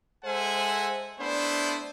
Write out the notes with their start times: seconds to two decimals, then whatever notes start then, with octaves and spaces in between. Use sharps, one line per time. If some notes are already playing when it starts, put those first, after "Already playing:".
0.25 G#3 A4 C5 E5 F#5 G#5
1.20 A3 B3 D4 E4 B4 C5